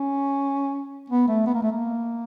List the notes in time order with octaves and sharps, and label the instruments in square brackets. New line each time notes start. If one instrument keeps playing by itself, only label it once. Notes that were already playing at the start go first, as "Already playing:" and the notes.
Already playing: [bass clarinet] C#4
B3
A3
B3
A#3
A3
A#3